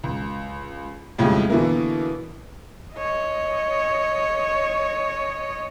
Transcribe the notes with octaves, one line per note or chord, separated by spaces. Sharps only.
C#2
F2 A2 C#3 F3 G3 G#3
B2 D3 E3 A#3 E4 A#4
C#5 D#5